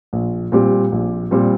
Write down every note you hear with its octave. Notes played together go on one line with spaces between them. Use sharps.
A#1
A#2 G3 C4 G4
A#1
A#2 G3 C4 G4